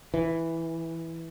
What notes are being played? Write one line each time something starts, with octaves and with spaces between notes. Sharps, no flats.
E3